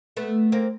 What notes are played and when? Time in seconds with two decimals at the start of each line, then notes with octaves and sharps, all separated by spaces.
0.17 A3 B3
0.52 A#3 C4